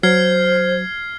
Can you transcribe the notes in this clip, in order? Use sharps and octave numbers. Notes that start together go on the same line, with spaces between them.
F#3 C5 F6 G#6 C7